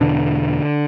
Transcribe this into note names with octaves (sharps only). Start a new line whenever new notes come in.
E2 B2 D3 D4